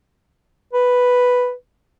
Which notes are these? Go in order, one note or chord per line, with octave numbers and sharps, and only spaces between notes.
B4